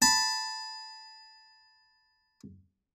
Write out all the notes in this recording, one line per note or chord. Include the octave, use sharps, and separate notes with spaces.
A5 B5